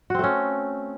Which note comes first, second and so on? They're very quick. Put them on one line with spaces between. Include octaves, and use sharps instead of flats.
F#4 C4 A3 C#4